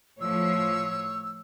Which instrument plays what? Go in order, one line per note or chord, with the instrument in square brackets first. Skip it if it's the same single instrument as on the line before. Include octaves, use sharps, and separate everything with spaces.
[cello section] A2 F3 [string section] C#5 [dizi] E6